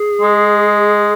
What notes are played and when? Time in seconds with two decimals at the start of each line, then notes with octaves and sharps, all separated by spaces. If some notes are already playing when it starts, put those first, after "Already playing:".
Already playing: G#4
0.21 G#3